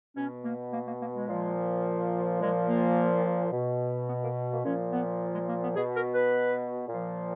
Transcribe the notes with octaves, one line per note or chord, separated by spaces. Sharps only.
B2 C#4
A#3
A#3
A#3
A#3
G#3
A#2 F3
A#2 F3 G#3
A#3
B2
B3
A#3
A#3
A#2 F3 C#4
B3
G#3
A#3
B3
B2 G#4
A#4
B4
A#2 F3